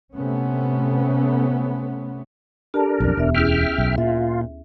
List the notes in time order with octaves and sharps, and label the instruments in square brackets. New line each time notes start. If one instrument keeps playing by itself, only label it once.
[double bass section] C3 A3 B3 C#4
[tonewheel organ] D4 A#4 [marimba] G4 A4 A5
[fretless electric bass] B1 F2
[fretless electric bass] E1 [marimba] D2 B3 E5
[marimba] C#4 E4 G#4 [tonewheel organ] E5 G5 F6
[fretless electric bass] B1
[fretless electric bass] A#2 [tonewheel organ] F4 [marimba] E5